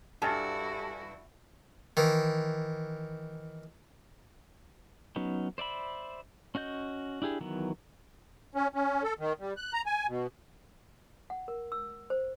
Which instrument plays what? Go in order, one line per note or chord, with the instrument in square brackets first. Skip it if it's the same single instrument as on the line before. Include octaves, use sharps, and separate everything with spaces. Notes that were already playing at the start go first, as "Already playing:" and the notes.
[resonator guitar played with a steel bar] G2 [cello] E4 F#4 [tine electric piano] G4 A4 A6 [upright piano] G#5 A5
[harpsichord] D#3 E3
[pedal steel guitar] F#3 B3 C#4 D#4
C5 D5 E5 B5
C#4 F#4 D#5 G6
D4 E4 G4 G#4
D#3 E3 F#3 B3
[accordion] C#4
C#4
A4
D#3
G3
F#6
A#5
G#5
B2
[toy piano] F#5
A#4
E6
C5